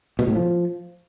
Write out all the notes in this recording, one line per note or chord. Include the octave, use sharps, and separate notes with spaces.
B2
A2
F3